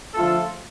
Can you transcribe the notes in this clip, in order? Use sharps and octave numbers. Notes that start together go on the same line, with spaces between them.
D3 F3 A3 F4 A4